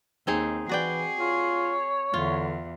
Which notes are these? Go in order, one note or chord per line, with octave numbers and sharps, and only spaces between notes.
D#2 C4 D#4 G#4
E3 F#4 G#4 D5 G5
F4 C#5
E2 D3 F4